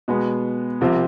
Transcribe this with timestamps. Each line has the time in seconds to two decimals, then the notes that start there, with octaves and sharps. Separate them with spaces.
0.08 B2 G#3 B3
0.81 C2 C3 F3 C4